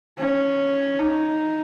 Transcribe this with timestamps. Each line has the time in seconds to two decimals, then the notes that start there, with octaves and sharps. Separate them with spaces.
0.18 C#4
0.99 D#4